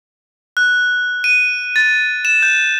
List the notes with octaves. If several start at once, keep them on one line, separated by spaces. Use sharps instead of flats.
F#6
D#7
A6
E7
G6